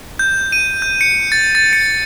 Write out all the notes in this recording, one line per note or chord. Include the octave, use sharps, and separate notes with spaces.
G6
D#7
G6
C#7
A6
A6
C#7